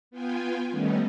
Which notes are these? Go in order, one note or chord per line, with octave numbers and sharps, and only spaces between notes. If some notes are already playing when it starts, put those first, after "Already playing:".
B3 F4 G5 G#5
D#3 G3 A3 B3 C#4 D#4